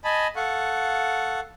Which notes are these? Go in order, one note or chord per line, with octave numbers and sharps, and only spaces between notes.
D#5 G#5 A5 B5
A4 F5 F#5 C#6